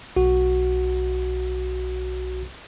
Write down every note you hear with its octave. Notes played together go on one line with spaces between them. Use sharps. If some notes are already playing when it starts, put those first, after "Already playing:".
B1 F#4